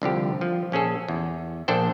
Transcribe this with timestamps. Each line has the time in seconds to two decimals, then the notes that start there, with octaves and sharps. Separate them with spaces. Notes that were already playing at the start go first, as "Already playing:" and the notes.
0.02 C2 D3 F3 G4
0.41 F3
0.72 A#1 C#4 G#4 A4
1.08 E2
1.68 A#1 A#3 D4 A4 C5 G5